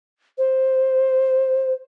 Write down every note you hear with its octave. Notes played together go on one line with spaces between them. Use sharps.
C5